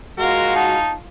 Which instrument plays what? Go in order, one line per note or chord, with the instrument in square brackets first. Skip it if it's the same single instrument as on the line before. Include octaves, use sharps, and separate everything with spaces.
[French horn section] G#3 F#4 [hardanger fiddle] F4 F5 [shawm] A#4
[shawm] D#4 [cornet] A5